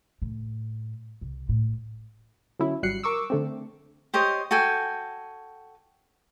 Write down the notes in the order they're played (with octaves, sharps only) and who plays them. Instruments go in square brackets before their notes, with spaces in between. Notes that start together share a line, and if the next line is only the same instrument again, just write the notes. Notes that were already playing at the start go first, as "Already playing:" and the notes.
[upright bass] A2
C2
A2
[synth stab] D3 F#3 C#4 E4
G#1 F#3 G3 F#6 C7 C#7
A#4 C#6 D6 E6
D3 A3 C4
[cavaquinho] G4 C5 C#5 D#5
F#4 A4 G5 G#5